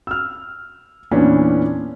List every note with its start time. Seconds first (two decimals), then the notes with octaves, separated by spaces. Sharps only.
0.07 E6 F6
1.11 E2 A#2 E3 B3 C#4 D4